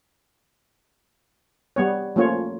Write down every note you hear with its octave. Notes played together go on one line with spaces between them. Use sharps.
G3 B3 C#5
F3 A3 A#3 C#4 F4 C#5